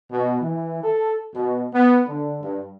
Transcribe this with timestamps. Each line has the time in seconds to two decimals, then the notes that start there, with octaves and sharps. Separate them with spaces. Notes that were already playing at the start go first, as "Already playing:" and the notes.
0.11 B2
0.42 E3
0.83 A4
1.35 B2
1.74 B3
2.07 D3
2.41 G2